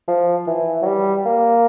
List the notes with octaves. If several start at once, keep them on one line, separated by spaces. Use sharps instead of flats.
F3
E3
F#3
G3
A#3